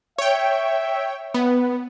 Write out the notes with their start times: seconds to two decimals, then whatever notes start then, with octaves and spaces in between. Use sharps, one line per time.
0.18 C#5 E5 G5
1.34 B3